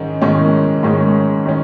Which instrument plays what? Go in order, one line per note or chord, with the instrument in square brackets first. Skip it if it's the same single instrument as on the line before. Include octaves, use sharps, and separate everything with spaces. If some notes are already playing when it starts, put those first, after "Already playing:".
Already playing: [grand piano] G#2 D#3 G#3 C#4
G#2 D#3 G#3 C#4
G#2 D#3 G#3 C#4
D#3 G#3 C#4